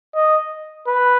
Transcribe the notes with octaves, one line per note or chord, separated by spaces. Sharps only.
D#5
B4